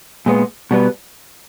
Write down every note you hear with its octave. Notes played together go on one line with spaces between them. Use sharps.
A#2 G#3 B3
B2 G3 B3